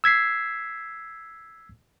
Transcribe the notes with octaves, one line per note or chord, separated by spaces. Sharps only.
E6 G#6 B6 C7